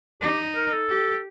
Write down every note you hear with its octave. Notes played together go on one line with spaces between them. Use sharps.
D#4 G4
A#4
A4
G4